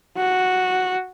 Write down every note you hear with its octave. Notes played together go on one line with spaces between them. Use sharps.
F#4